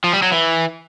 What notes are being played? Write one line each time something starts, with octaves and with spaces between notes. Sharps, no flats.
F3
G3
F#3
E3